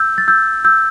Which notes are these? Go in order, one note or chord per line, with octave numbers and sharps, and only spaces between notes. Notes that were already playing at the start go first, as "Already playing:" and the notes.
Already playing: E6 G6
A6
E6 G6
E6 G6